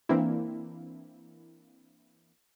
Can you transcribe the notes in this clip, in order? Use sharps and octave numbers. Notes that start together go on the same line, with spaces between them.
E3 A#3 C4 D4 E4